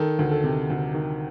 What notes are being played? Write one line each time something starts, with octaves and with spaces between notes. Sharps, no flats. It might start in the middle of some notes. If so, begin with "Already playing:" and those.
Already playing: D#3 A4
D2
A4
C3
D2
D#3